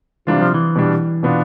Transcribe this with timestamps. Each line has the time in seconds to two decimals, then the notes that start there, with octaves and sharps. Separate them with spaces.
0.27 C3 E3 G3 D4 F4
0.41 F3
0.54 E3
0.76 B2 G3 D4
1.23 B2 B3 D4 F4